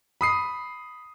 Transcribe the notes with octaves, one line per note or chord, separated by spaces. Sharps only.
B5 D#6 C7